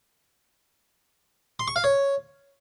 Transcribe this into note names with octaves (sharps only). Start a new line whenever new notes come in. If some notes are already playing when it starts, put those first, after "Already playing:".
C6
C#6
F5
C#5